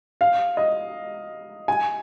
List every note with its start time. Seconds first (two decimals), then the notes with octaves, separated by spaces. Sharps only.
0.21 F5
0.57 D#5
1.68 G#5